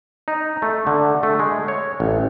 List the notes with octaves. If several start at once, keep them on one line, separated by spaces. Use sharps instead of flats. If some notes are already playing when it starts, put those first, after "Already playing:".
D#4
A3
D3
A3
G#3
C#5
A1